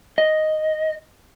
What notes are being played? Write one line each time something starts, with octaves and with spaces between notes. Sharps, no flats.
D#5